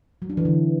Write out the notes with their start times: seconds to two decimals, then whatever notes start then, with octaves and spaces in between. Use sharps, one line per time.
0.22 F#3
0.30 D4
0.37 E3
0.45 D3